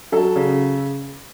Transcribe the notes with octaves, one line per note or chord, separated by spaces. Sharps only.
F#3 A4
C#3